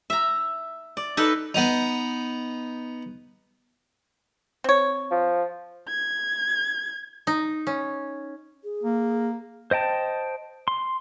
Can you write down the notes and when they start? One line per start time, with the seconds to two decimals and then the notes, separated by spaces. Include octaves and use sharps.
0.10 E5 A#5
0.97 D5
1.17 D#4 A4 B4
1.54 B3 D#4
4.64 C4 C#5
5.11 F3
5.88 G#6
7.27 D#4
7.67 C#4
8.63 G#4
8.84 A#3
9.71 C5 D#5 G5 A5
10.68 C6